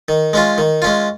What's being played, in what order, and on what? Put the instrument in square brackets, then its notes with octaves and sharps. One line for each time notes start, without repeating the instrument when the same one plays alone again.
[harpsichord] D#3
G#3 C#4 F4
D#3
G#3 C#4 F4